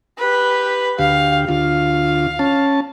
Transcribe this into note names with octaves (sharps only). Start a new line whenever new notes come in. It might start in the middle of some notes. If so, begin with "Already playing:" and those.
G4 B4
D2 G4 F5
D2 F4 F5
C#4 A5